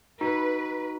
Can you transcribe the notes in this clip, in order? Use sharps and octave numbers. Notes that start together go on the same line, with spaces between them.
D#4 F#4 B4